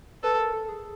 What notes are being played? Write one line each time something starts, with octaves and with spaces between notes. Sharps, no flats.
A4 B4
A#4
A4
G#4